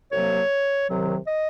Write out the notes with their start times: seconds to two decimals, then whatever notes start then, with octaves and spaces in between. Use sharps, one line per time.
0.12 C2 C3 F#3 A#3 C#5
0.89 C2 C3 D#3 F#3
1.28 D#5